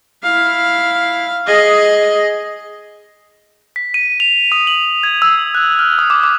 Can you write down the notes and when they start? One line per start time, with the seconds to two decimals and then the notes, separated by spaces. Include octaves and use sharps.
0.24 E4 F5
1.47 G#4 D#5
3.76 B6
3.94 D#7
4.20 F7
4.52 D#6
4.67 F#7
5.03 G#6
5.22 E6
5.55 F#6
5.79 F6
5.99 D#6
6.10 D6
6.23 D6